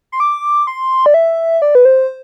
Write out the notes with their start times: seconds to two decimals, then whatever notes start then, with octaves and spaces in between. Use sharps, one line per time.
0.12 C6
0.20 D6
0.67 C6
1.06 D5
1.14 E5
1.62 D5
1.75 B4
1.85 C5